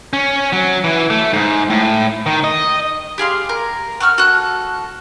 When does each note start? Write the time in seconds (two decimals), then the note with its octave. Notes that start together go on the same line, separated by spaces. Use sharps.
0.13 C#4
0.53 F#3
0.84 E3
1.10 A3
1.33 G#2
1.70 A2
2.26 D#3
2.44 D#5
3.18 G4 G#4 F5 C6
3.49 A#4
4.01 F#5 C#6 E6 F6
4.18 F#4 A4 F#6